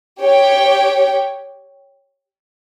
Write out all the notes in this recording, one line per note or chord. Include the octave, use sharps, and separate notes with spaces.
G4 C#5 G5